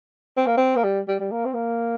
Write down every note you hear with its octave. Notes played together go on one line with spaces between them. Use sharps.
C4
A#3
C4
A#3
G3
G3
G3
A#3
C4
A#3